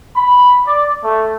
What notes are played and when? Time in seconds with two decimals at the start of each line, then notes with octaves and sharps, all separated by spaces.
0.15 B5
0.67 D5
1.04 A3